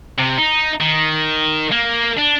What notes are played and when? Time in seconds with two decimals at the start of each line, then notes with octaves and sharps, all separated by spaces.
0.18 C3
0.38 D#4
0.80 D#3
1.72 A#3
2.18 D4